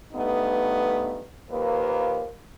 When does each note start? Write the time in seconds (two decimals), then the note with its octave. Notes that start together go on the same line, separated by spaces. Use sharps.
0.13 G2 A3 B3 D#4
1.50 D#2 F3 A#3 B4